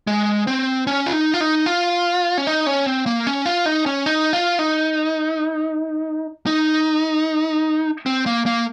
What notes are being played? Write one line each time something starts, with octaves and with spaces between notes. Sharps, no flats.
G#3
C4
C#4
F4
D#4
F4
D#4
F4
C#4
D#4
C#4
C4
A#3
C#4
F4
D#4
C#4
D#4
F4
D#4
D#4
C4
A#3
A#3